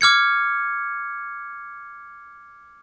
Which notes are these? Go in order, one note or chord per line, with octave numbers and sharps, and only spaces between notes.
D6 F6 G#6 C#7